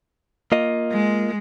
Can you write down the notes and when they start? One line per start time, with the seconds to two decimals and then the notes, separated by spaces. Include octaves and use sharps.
0.52 A#3 F4 D#5
0.92 G#3